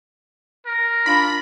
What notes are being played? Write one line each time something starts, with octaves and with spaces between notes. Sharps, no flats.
A#4
D4 F4 B5